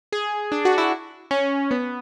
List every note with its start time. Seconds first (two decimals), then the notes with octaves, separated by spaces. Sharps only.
0.12 G#4
0.52 D4
0.65 F#4
0.78 E4
1.31 C#4
1.71 B3